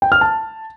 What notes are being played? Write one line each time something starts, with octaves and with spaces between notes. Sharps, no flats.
G5
F6
A5